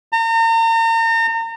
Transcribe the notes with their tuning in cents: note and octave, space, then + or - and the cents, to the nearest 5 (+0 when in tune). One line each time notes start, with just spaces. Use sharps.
A#5 -40